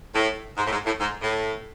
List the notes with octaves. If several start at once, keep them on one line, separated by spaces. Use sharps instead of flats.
A2
G#2
A2
G#2
A2
G#2
A2